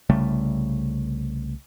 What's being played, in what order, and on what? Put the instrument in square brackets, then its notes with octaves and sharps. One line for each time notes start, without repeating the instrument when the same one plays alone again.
[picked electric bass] C2 C#3 G3 A3